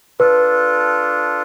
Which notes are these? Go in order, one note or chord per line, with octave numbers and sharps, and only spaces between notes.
D4 F4 A4 B4